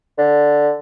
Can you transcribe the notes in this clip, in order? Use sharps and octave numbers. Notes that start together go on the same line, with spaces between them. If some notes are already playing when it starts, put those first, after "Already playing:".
D3